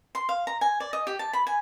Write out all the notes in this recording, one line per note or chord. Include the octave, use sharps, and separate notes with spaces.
C6
F5
A#5
G#5
D5
D#5
G4
A5
B5
G#5